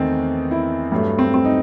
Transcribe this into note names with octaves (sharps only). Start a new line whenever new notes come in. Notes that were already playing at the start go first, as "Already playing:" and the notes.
Already playing: E2 D#3 A3 C4 D#4
E4
G2 F#3 A3
C4
C4
D#4